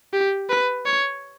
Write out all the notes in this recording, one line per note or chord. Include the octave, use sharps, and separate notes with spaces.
G4
B4
C#5